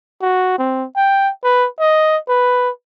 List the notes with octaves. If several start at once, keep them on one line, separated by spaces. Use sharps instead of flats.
F#4
C4
G5
B4
D#5
B4